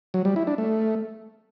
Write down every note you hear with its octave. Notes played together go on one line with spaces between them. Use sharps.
F#3
G3
E4
D4
A3